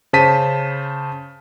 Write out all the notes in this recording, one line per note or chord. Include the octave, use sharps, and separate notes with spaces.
C#3 C5 A5 B6 D#7